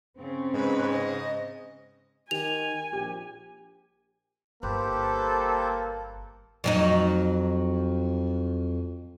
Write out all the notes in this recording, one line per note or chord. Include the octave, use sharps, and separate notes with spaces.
C#3 C4 C#4
G#2 B4
D#5
D#3 G4 G#5 F7
A#1 G4
G1 A#3 G4 A4 B4 C5
F2 F#3 D#4